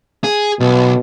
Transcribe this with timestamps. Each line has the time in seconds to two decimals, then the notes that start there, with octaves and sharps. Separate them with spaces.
0.24 G#4
0.60 B1 B2